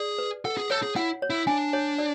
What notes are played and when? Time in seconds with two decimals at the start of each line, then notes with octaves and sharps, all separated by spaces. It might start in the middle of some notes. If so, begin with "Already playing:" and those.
Already playing: G#4 D5
0.19 B4
0.45 A4 F#5
0.57 G#4
0.70 A4 C#5
0.83 G#4
0.96 E4 F#5
1.22 C#5
1.30 E4
1.47 D4 G#5
1.73 C#5
1.98 D5